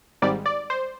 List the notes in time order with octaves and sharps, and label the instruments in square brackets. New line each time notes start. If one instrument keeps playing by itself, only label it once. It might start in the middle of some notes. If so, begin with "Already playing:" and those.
[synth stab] G#1 G#2 G3 D5
D5
C5